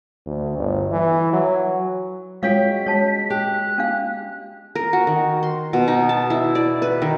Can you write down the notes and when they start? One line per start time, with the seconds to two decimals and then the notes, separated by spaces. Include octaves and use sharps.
0.26 D2
0.58 G1
0.92 E3
1.33 F#3
2.43 G#3 C#4 F4 F#4 C#5 F5 G5 B6
2.86 G#3 C#5 A5
3.30 G4 F#6
3.78 C#4 D4 F5
4.75 A#4
4.93 F#4
5.07 D#3
5.43 C6
5.73 B2
5.88 D#4
6.09 A5
6.30 E4
6.55 D5
6.82 B4
7.02 D#3